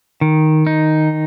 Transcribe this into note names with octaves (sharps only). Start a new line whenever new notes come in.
D#3
D#4